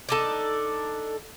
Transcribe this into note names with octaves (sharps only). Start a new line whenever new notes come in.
D4 D#4 A4